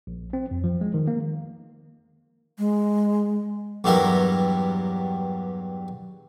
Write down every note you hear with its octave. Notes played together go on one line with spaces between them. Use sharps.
A#1
C4
F2
F3
G#3
D#3
A#3
G#3
E2 G2 F#3 G3 E4 A#4